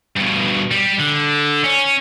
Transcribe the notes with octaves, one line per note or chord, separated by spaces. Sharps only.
G2 B2
G3
D3
C#4